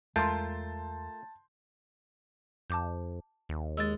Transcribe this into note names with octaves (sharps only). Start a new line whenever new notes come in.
E2 G#3 A3 F4 A#4 A5 C6 G6
F2 A5 D6 G6
D#2
G#3 E6 A6